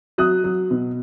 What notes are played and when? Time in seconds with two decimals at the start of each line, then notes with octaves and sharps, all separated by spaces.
0.18 F#3 D#6 F#6
0.44 F#3
0.71 B2